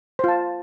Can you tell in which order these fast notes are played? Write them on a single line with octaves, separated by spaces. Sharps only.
C5 F4 A5